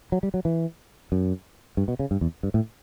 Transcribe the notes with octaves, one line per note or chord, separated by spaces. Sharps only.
F#3
G3
F#3
E3
F#2
G2
B2
C#3
G2
E2
G2
A2